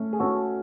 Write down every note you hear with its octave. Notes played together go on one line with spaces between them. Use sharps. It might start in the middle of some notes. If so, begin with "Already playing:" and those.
Already playing: A3 C#4
G#4
C#4 F#4 A4